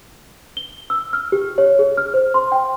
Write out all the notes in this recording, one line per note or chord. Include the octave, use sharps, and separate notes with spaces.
G7
E6
F6
G4
C#5
G#4
F6
C5
C6
G5